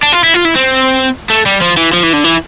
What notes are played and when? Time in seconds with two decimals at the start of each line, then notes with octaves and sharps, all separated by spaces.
0.03 D4
0.13 F4
0.24 E4
0.34 F4
0.45 E4
0.55 C4
1.30 A3
1.46 G3
1.62 F3
1.77 E3
1.93 F3
2.03 E3
2.13 D3
2.24 E3